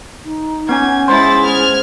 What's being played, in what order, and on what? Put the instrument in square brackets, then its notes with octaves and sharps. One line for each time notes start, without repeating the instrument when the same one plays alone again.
[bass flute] D#4
[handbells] B3 C#4 G#5 [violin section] G#6
[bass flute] G#3 [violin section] E4 A6 [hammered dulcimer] C5
[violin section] F6 G#6